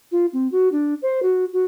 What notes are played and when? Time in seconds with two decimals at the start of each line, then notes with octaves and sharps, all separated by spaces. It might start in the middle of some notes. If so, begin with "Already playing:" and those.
0.12 F4
0.33 C4
0.52 F#4
0.72 D4
1.02 C5
1.23 F#4
1.53 F#4